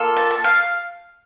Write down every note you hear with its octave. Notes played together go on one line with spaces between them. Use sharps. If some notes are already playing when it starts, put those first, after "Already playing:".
Already playing: A#3 F4 A4
A5
A5
F5